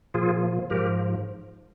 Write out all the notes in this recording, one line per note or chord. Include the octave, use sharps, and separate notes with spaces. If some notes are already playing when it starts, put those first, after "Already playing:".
A#2 F3 F4 G#4
G#2 F3 G4 A#4